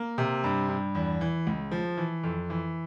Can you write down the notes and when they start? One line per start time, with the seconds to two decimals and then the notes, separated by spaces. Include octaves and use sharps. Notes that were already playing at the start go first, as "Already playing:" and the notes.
Already playing: A#3
0.18 C3
0.44 G2
0.68 G2
0.95 E2
1.21 E3
1.47 C#2
1.71 F3
1.97 E3
2.23 F2
2.50 E3